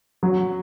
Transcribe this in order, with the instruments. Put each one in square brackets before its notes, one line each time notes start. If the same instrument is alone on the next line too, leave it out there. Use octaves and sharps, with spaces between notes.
[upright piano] F#3